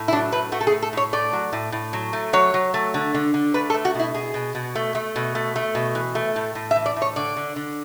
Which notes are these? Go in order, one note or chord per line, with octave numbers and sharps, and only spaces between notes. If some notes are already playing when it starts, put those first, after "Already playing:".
Already playing: A2
E4
F#3 D4
A2 B4
A3 F#4
A4
G#4
A2
A4
A2 C#5
A3 D5
F#3
A2
A2
F#3
A3
F#3 C#5
F#3
A3
D3
D3
D3
A3 B4
A4
A3
F#4
B2 E4
B2 G#4
B2
B2
A3
A3
B2
A3
A3
B2
E3
A3
A2
A2
E5
E3
D5
A2
C#5
D3 D5
D3
D3